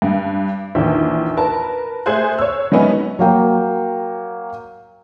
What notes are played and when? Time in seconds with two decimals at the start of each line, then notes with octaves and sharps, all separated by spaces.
0.02 G2
0.75 A#1 E2 D#3
1.37 A#4 B4 A5
2.06 A3 G#4 C5 G#5 C6 F#6
2.39 C#5 E6
2.72 F#3 G#3 A3 B3 C#4 D#4
3.19 F#3 A#3 G5